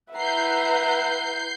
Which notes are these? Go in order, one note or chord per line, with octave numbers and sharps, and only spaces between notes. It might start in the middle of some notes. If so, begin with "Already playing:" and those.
E4 B4 E5 F#5 A#5 G6 C7